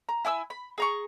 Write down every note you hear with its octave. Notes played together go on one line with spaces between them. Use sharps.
A#5
E4 G#5 D6 E6
B5
G#4 A#5 C#6